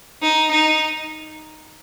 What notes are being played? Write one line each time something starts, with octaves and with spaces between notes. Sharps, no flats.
D#4
D#4